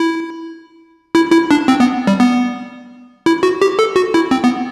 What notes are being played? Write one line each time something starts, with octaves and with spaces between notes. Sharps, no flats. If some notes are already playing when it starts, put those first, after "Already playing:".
Already playing: E4
E4
E4
D4
C4
B3
G3
B3
E4
F#4
G4
A4
F#4
E4
C4
B3